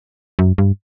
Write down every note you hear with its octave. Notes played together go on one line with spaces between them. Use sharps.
F#2
G2